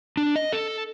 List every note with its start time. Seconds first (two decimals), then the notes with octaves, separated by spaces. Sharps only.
0.17 D4
0.36 D#5
0.52 A4